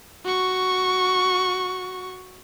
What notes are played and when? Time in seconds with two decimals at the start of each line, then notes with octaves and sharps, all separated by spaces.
0.25 F#4 C#6